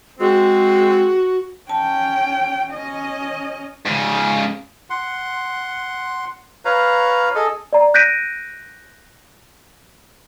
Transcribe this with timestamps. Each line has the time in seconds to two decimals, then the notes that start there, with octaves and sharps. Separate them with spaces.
0.20 G#3 C4 F#4
1.69 C#4 G5 A5
2.72 C#4 D#5
3.86 G#2 C#3
4.90 F#5 C6
6.65 B4 C#5 F5 A#5
7.35 G#4 A4 D#5
7.73 D5 A#5
7.94 F#6 G6 A#6 B6 D7 D#7